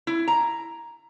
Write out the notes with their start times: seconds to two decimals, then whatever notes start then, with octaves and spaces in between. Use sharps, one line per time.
0.07 E4
0.28 A#5